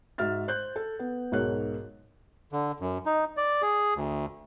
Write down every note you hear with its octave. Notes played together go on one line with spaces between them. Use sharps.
G#2 F#4 E5 F6 A6
C5 F#6 G6
A4
B3
B1 G#2 G#4 A#4 C#5 F#6
D3
F#2
D#4
D5
G#4
D2